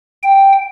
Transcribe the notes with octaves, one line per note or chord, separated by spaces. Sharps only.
G5